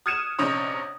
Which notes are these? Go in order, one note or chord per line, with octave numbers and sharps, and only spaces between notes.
D#6 F6 G#6 C#7 D#7 E7
A#1 C3 C#4 D#4 C#5 D#6